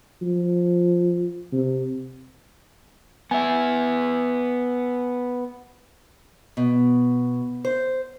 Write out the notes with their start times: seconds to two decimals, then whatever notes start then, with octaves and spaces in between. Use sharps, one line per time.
0.22 F3
1.53 C3
3.31 B3 E5 G#5
6.57 B2
7.65 C5